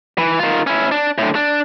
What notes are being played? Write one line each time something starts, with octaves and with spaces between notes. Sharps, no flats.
E3
D#3 F4
C#4 E4
D4
A2 D3
D4